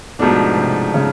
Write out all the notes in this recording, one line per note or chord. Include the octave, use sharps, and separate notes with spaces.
G#2 B2 F3 A3 D4
C3
C#3